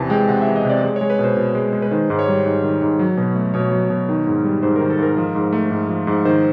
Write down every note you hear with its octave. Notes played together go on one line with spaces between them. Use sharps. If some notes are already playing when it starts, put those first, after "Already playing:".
Already playing: E2 C3 E3 A5
G#3 G5
C3 F#5
E5
E3
D#5
C3 D5
G#3
G#3 C#5
B4
B2 C5
B2
G#3
G#3
B4
D#3 C5
G#2
C#5
G3
G#2
D#3
G#2
F#3
B2
A3
B2 C#5
F#3
B2
D#3
G#2
G3
G#2 C5
D#3 A#4
A4
G#2 A#4
F3
G#2
A3
G#2
F3
G#2
D#3 C5